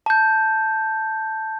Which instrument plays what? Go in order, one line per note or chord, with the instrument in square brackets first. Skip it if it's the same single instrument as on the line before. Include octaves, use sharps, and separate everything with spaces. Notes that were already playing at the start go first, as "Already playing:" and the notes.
[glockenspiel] A5 G6